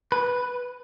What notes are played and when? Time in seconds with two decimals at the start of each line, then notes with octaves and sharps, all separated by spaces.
0.12 B4